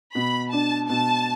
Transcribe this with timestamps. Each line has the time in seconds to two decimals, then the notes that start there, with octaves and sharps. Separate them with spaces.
0.15 B2 B5
0.52 D4 A5
0.89 B2 A5